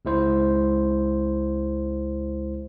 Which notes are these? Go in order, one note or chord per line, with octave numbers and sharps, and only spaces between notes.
C#2 G#3 E4 C5